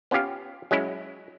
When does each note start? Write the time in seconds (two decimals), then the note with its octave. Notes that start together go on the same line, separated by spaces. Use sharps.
0.11 B3 C#4 F4 G4 F5
0.71 F#3 G#3 C#4 E4